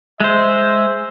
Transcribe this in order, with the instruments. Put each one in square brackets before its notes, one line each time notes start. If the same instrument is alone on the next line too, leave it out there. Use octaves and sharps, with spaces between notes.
[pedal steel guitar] G#3 C5 [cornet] E5